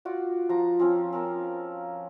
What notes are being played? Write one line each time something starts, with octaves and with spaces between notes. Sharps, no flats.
F4 F#4 D5
F3 A#5
F3 C4 C#4
C4 C#4 A#4